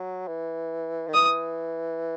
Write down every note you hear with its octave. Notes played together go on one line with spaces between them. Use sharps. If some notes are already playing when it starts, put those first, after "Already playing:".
Already playing: F#3
E3
D#3
E3 D#6